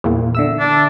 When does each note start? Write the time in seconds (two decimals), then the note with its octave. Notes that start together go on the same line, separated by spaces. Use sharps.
0.04 E2 A#2
0.35 D3 E5 E6
0.59 D4